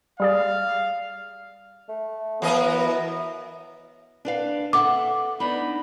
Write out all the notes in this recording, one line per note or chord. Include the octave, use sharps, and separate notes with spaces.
G3 G#4 D5 F5
A3
E3 F#3 B3 A#4 D#5
E4
D4 B4 F5
A4 E5 F#5 D6
B3 D4 D#4 B5